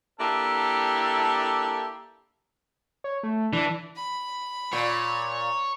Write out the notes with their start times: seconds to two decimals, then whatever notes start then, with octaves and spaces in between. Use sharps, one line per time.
0.20 A#3 D4 E4 G4 A4
3.04 C#5
3.23 A3
3.53 E3 D4
3.96 B5
4.73 A#2 C#5